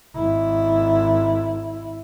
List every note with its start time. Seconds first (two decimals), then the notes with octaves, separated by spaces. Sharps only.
0.15 G#1 E4